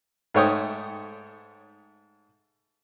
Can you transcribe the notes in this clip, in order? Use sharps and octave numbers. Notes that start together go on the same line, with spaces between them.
G#2 A3 C#5 G5 D#6